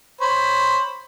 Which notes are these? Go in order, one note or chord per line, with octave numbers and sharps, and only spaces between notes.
C5 C#5 B5